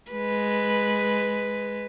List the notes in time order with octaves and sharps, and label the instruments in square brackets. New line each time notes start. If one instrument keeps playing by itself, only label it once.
[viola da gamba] G#3 B4